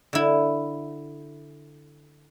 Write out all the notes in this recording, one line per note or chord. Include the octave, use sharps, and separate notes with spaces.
D3 E4